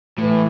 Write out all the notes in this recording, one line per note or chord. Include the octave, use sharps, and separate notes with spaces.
A2 E3